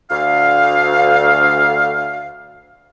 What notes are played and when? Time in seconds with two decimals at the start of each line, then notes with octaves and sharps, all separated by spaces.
0.11 D2 F5